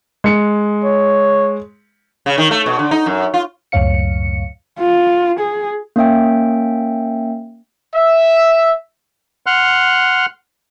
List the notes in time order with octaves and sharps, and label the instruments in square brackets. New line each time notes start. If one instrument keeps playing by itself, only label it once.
[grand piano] G#3 C#7
[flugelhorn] C#5
[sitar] C#3
D#3
A3
B2
D3
D#4
F#2
F4
[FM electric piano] C#2 F#2 A2 C#5 F5 C#7
[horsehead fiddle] F4
G#4
[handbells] A#3 C#4 E5 G5
[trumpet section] E5
[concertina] F#5 C6 F6 F#6